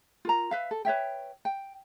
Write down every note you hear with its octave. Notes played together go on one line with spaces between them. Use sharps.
F4 A#4 A#5
B4 E5 F5
A4
B4 C#5 E5 G5
G5